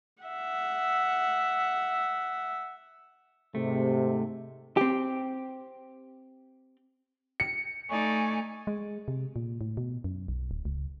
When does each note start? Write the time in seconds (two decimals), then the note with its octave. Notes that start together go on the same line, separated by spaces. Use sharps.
0.23 E5 F#5
3.55 G#2 C3 A3
4.77 C4 G4
7.40 C#7
7.89 A3 D#4 D5 G#5 C#6
8.67 G#3
9.08 C3
9.36 A#2
9.61 A2
9.77 B2
10.04 F#2
10.28 B1
10.51 D1
10.65 C#2